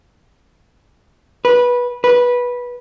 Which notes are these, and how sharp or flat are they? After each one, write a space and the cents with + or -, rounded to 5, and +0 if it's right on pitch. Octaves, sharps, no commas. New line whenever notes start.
B4 -15
B4 -15